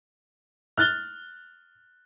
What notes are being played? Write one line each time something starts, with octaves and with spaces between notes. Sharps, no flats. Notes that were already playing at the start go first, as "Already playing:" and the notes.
F6 F#6 A6 G7